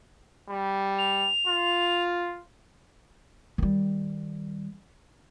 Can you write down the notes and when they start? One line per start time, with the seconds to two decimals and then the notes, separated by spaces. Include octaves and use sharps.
0.50 G3
0.98 F7
1.47 F4
3.58 D#3 G3